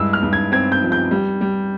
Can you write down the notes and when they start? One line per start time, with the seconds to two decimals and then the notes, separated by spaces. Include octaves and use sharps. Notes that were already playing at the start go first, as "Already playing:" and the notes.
Already playing: G2 G#3 E4 E6
0.13 F6
0.23 G2
0.33 G#6
0.52 C4 G#6
0.72 G6
0.82 F3
0.92 G6
1.11 G3
1.41 G3